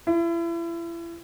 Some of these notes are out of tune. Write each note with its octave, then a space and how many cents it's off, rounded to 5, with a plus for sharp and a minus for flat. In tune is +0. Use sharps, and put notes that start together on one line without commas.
E4 +35